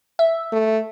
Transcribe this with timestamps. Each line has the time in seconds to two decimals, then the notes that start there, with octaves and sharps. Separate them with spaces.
0.19 E5
0.52 A3